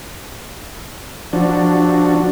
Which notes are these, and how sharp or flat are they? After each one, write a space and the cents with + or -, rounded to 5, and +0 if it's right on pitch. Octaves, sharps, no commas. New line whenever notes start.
F3 +0 D4 +0 F#4 +0